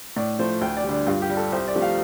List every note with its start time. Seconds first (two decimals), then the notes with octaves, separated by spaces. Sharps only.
0.17 A2 D5
0.39 F3 A3 C5
0.61 D2 G5
0.77 D5
0.84 G3
0.89 D3 D4
1.07 G2 F4
1.22 G4
1.30 G3
1.37 A4
1.52 C2 C5
1.68 D5
1.75 C3 F3 A3
1.82 F5